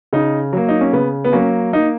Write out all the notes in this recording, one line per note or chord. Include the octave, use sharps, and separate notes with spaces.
C#3 D#4
F#3 A#3
D#4
C#4
C#3 B3
B3
F#3 A#3 C#4
A#3 D#4